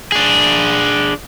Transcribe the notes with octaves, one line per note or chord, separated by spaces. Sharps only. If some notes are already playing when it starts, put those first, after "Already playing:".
D4 G#4